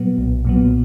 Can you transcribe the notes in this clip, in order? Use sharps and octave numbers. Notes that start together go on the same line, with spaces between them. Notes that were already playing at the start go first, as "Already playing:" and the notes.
Already playing: A#2 F#3 B3
B1
A#2 F#3 B3